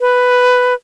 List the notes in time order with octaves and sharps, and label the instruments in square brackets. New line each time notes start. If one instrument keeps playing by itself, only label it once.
[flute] B4